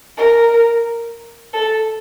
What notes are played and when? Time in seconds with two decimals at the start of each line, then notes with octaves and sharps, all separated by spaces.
0.17 A#4
1.54 A4